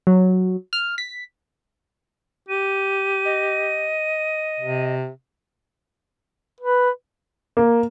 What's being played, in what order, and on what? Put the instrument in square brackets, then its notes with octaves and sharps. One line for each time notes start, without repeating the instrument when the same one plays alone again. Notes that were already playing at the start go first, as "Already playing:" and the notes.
[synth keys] F#3
F6
B6
[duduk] G4 [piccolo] D#7
[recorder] D#5
[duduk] C3
B4
[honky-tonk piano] A#3